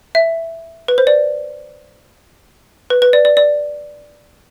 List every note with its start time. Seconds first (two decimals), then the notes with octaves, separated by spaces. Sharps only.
0.15 E5
0.88 B4
0.98 C5
1.07 D5
2.90 B4
3.02 B4
3.13 D5
3.25 D5
3.37 D5